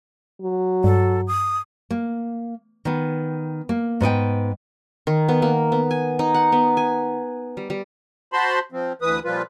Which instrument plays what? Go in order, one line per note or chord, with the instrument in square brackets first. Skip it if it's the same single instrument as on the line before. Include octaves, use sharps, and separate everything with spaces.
[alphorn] F#3
[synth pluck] G2 [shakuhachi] A4
[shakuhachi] D#6
[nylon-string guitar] A#3
D#3 B3
A#3
G#2 B3 D#5 G5
[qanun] D#3
B3
A#3
B3
G#5
D#4
F#5
B3
G#5
G3
G3
[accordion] F#4 C5 A5 B5 C6
F3 C4
D2 E3 B4 D#6
A#2 F3 G3 F4 B4